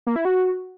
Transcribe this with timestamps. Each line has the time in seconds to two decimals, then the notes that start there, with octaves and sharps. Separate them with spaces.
0.07 A#3
0.16 E4
0.25 F#4